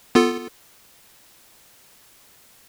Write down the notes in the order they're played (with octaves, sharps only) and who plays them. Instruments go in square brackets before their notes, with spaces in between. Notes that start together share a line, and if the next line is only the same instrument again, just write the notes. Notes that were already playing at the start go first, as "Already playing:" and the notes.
[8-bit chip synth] B3 F4 A4